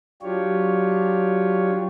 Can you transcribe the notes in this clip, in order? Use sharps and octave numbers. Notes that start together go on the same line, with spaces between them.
F#3 D4 F4 G4 C#5